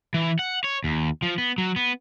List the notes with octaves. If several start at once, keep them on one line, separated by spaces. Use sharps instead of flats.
E3
F#5
C#5
D#2
F3
B3
F#3
B3